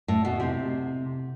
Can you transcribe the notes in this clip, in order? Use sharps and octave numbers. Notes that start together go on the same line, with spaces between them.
A2
B2
C3